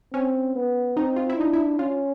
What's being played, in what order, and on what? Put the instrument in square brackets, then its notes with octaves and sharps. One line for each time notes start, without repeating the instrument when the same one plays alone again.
[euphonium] C4 [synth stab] C#4
[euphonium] B3
[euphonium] C4 [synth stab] D#4
[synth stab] F4
E4
[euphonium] D4 [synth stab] D#4
[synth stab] E4
[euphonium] C#4 [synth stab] F4